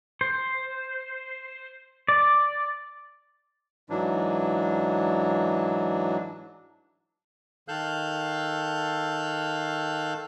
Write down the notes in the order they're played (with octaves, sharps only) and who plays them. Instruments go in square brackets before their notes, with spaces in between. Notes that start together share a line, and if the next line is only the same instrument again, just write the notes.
[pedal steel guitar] C5
D5
[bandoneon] G#2 E3 F#3 D4
D#3 A4 F5 E6 F#6 G6